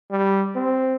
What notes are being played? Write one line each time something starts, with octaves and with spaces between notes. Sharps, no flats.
G3
C4